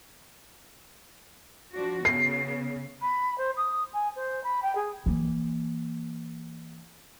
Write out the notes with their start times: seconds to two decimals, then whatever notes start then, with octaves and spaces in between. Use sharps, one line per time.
1.73 F3 D4 F#4
2.05 C#3 B3 C7
3.02 B5
3.38 C5
3.57 D#6
3.93 G#5
4.16 C5
4.44 B5
4.63 G5
4.76 G#4
5.06 E3 A#3